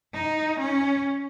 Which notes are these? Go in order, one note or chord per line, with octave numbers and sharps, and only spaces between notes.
D#4
C#4